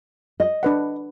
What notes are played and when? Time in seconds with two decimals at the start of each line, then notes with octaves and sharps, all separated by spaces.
0.40 D#5
0.63 D4 B4 F#5